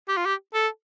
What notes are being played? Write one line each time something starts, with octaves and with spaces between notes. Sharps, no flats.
G4
F4
G4
A4